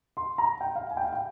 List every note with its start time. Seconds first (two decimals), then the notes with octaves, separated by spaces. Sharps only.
0.17 C6
0.38 A#5
0.61 G5
0.76 F5
0.91 G#5
0.97 G5
1.04 F5
1.13 G5